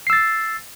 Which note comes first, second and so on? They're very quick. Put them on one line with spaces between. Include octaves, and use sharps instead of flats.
C7 E6 A6